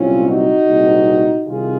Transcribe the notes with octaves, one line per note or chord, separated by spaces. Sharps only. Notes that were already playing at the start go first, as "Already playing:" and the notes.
Already playing: C2 A#2 F#3 C4 C#4 F4
D#4 F#4
C2 A#2 G#3 C4
C2 C3 D#3 F4 G#4